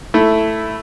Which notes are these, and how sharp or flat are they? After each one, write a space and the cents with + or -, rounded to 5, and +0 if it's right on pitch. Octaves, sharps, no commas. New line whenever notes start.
A3 +0 E4 +0